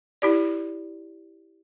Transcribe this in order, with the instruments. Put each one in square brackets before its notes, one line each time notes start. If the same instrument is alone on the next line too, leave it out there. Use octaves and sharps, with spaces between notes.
[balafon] E4 G4 D5